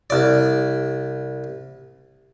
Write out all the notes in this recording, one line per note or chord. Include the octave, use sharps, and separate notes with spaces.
C2 D5